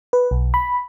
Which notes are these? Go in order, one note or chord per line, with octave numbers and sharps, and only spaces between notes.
B4
B1
B5